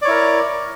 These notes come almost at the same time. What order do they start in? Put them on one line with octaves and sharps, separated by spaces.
D5 C#5 E4 A#4